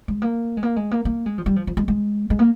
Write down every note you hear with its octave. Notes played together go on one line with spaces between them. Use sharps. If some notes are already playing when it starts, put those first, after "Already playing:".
G#3
A#3
G#3
A#3
G#3
A#3
A#3
G#3
F3
G3
F3
F3
G#3
G#3
G#3
A#3